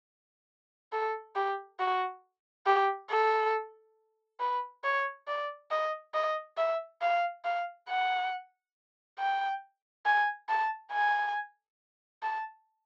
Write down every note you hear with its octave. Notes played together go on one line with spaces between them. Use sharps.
A4
G4
F#4
G4
A4
B4
C#5
D5
D#5
D#5
E5
F5
F5
F#5
G5
G#5
A5
G#5
A5